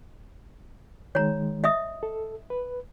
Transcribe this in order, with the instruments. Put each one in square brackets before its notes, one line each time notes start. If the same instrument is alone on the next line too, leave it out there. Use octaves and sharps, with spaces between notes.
[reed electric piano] D#3 G#3 [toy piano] C#5 A#5
[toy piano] D#5 E5 D#6
[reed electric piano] A4
B4